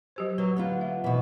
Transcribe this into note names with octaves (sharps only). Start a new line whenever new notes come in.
F#3 G4 C5
F#3 B4
D3 B3 F4
E5
B2 E3